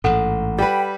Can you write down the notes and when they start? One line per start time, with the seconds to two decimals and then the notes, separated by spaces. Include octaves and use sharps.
0.04 A1 G#2 A4 F#5
0.59 G3 B4 G5